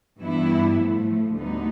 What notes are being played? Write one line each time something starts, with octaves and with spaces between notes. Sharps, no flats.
G2 E3 G3 B3 E4
A2 F3 A3
D2 D3 G3 B3 D#4